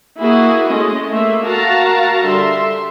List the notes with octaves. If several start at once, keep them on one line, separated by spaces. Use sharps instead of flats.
A#3 E4 F#4 G#4
G#3 A3 C#4 D#5
A3 A#3 E5
F#4 A#4 F5 A5 A#5
D3 G3 E5 C6